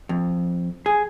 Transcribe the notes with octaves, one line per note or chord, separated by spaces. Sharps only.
F2
G#4